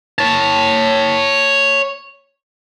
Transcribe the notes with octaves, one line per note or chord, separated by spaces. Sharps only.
C#5 A5